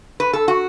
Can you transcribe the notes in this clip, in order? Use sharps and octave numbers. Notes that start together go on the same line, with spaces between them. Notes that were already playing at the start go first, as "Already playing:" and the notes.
B4
A4
F#4